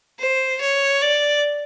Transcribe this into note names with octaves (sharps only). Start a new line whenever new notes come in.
C5
C#5
D5